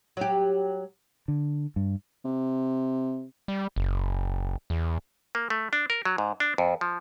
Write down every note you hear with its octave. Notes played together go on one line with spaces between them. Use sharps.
F#3 G4
D3
G2
C3
G3
F#1
E2
A#3
A3
D4
A#4
F#3
G#2
D4
F2
F3